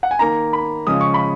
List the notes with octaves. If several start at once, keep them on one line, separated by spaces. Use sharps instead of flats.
F#5
G#5
D#3 A#3 D#4 A#5
B5
C#3 F3 G#3 C#4 D#6
C#6
B5